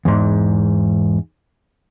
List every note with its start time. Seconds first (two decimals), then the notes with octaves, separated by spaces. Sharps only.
0.05 E2 G#2